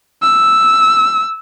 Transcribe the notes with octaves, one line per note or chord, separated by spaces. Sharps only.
E6